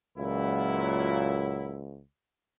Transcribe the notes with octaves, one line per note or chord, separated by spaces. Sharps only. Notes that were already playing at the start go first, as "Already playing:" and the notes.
C#2 A#2 F#3 E4